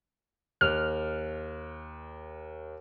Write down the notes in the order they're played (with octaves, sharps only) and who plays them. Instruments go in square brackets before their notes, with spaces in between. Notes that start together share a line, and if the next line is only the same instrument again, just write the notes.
[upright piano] D#2 F#6 [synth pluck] F6